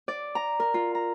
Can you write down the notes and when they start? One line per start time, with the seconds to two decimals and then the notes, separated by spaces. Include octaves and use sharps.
0.08 D5
0.35 A#5
0.60 A#4
0.74 F4
0.95 A#5